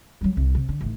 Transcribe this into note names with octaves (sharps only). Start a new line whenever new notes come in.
F#3 G3
C2
C3
D3
A1 D#3